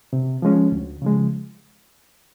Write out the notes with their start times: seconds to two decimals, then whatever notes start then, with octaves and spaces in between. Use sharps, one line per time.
0.13 C3
0.42 F3 G#3 C#4
0.72 D2
1.02 C#3 F3 G#3